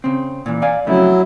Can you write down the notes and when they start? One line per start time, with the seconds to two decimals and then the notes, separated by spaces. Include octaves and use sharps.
0.04 C#3 C4
0.46 A#2 E3
0.62 D5 F5 G#5
0.87 F2 C#3 F#3 A3 E4